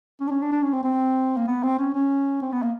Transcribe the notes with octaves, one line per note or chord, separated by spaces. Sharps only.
C#4
D4
C#4
D4
D4
C#4
C4
C4
A#3
B3
C4
C#4
C#4
C4
B3
A#3